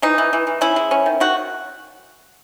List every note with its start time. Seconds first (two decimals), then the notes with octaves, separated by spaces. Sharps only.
0.02 E3 D#4
0.18 E3
0.33 E3
0.47 E3
0.61 C#4 E4
0.76 G#3
0.91 C#4
1.06 D#3
1.20 D#3 F#4